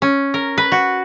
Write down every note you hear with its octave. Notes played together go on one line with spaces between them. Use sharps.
C#4
A#4
B4
F#4